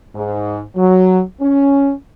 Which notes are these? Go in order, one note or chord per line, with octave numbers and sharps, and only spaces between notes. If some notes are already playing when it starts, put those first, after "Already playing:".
G#2
F#3
C#4